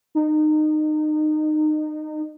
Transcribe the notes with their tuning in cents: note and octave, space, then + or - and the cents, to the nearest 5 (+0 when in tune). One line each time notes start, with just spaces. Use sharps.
D#4 -25